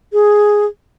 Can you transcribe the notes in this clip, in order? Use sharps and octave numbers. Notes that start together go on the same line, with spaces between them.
G#4